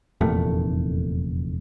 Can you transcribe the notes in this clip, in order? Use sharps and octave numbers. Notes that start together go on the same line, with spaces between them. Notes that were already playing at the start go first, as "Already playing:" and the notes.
F1 E2 A#2 A3